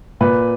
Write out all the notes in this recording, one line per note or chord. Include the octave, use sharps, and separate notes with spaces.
A#2 B4